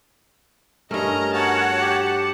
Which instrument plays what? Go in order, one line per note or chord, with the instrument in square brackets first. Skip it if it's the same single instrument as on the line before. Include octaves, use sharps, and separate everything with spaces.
[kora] G2 A3 [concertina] C#4 A#4 [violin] D#5 A#5
[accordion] F#4 C#5 [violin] F#5 A5
[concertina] G4